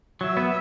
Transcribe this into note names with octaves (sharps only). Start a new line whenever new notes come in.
F#3 E5
B3